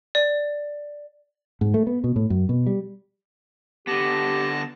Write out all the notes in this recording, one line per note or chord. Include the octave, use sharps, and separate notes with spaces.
D5
G#2
A3
B3
B2
A2
F#2
B2
G3
D3 B3 G4 A5 A#6